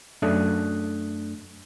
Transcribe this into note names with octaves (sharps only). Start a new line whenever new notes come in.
F#2 A3 D4 D#6 F#6